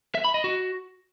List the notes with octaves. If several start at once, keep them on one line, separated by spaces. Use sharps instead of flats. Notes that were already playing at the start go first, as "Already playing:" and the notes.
E5
B5
D#5
F#4